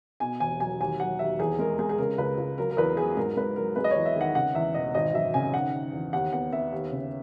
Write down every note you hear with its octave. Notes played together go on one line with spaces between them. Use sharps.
B2 G#5
E1 G#5
F#3 G#5
D#2 G#5
F#3 F#5
D#2 E5
E2 G#4
G#3 A#4
G#3 G#4
G#4
C#3 A#4
C#2 B4
C#2
F#3 A#4
A#4
E2 B4
F#3 G#4
G#2 A#4
G#2 B4
F#3 A#4
G#3 B4
D#5
E2 C#5
E5
D#3 F#5
C#3 F#5
E2 E5
E1 D#5
G#1 D#5
F#2 E5
C#3 G#5
D#3 F#5
D#3
E2
D#2 F#5
B3 F#5
B3 E5
D#2
C#3